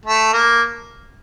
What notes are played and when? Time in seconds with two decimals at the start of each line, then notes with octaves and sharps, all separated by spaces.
0.06 A3
0.33 A#3